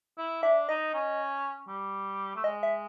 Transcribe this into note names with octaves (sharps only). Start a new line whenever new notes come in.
E4
D4 E5
D#4 D#5
C#4
G3
A3
G#3 D#5
E5